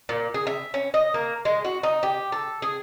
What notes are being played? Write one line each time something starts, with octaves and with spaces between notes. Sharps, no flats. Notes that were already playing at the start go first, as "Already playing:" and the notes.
A#2
G#4
E5
C#4
D#5
A#3
G#3
F#4
D#4
G4
A4
G#4